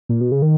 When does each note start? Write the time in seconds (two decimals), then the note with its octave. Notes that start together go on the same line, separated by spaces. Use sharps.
0.09 A#2
0.21 B2
0.32 C#3
0.42 D#3